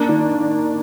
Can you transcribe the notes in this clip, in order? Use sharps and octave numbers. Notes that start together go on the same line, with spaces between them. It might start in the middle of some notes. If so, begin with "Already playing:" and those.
Already playing: A#3 D4
D#3